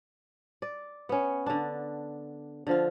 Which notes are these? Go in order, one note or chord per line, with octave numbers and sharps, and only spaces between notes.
D5
B3 C#4
D3 D4
D3 F3 F4